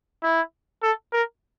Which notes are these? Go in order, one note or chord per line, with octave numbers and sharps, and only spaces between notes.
E4
A4
A#4